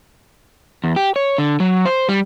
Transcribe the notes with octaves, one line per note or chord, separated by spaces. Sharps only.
E2
G4
C#5
D3
F#3
C5
G3